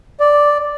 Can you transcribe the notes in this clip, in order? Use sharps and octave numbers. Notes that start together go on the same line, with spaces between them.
D5